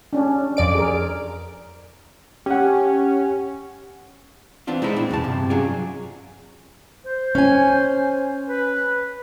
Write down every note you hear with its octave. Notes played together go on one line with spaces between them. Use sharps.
C#4 D4
F2 D5 D7
G#4 A#4
C#4 G4 F#5
E3 B3 C4 D4 F4
G#3 C4 D#4 E4
A#2 C4 D4
B1 E2 C#3 A5
G2 C3
F#3 C#4 F4 G#4 D5
C5
C#4 G#5
B4